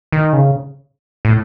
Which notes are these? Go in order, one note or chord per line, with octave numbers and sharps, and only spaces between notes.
D#3
C#3
A2